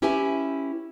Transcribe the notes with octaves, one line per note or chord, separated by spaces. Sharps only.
C#4 E4 G4 B4 E5 G#5